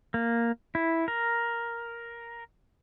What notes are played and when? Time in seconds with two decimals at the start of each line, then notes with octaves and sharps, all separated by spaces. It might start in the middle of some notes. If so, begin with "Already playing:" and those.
0.14 A#3
0.75 E4
1.08 A#4